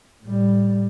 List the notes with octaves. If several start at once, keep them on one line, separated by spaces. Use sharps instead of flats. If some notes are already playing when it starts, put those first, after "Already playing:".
A2 G3